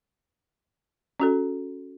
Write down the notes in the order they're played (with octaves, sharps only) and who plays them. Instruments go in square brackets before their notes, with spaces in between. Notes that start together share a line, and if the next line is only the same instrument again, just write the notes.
[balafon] C#4 F#4 A4